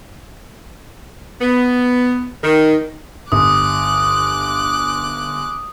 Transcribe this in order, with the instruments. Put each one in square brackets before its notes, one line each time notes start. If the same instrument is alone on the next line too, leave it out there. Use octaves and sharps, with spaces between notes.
[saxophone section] B3
D#3
[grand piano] G1 [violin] D6 F#6 [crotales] D#6